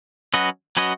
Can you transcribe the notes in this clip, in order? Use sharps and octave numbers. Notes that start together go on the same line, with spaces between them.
F#3 C#4 F#4 B4 D#5
F#3 C#4 F#4 B4 D#5